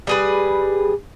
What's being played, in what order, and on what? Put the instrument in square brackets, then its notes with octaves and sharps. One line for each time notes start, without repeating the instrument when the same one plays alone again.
[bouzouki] G3 G#4 B4